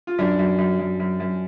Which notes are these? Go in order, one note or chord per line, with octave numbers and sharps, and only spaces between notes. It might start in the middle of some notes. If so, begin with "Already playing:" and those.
F4
F#2 D4
F#2
F#2
F#2
F#2
F#2